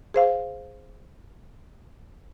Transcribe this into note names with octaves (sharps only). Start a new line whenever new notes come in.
G#4 C5 F5